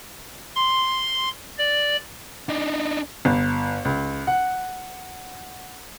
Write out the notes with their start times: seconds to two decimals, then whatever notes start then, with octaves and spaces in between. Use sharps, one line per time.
0.56 C6
1.58 D5
2.49 D4 D#4
3.25 G1
3.85 C#2
4.27 F#5